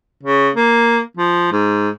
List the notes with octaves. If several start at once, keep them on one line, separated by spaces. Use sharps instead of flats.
C#3
A#3
F3
G#2